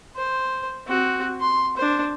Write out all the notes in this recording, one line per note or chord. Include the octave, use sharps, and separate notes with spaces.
C5
C4 F#4
C6
D4 C5